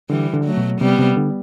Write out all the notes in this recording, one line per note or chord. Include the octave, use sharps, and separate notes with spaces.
D3 E3 G3
D3
F#3 A3
B2
C3 G3 B3
C3
D3